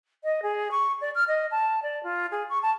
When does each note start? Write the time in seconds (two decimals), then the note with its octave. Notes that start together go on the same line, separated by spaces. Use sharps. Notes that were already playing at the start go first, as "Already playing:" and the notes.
0.24 D#5
0.43 G#4
0.71 C#6
1.01 D5
1.15 F6
1.28 D#5
1.51 A5
1.83 D5
2.04 F4
2.31 G#4
2.50 C#6
2.63 A5